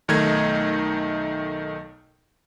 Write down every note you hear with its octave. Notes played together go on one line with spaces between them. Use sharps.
B1 D#3 A3 D#4 G#6